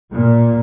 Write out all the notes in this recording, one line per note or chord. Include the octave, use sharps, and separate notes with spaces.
A#2